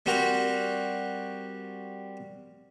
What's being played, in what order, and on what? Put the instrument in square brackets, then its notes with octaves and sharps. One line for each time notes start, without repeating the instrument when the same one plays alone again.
[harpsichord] G3 C4 F#4 A#4 F#5